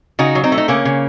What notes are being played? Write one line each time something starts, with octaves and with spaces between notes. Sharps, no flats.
C#3 D#4 F#4
F#3
C4 D#4
A3
D#4
C#3 A#3 C#4
C#3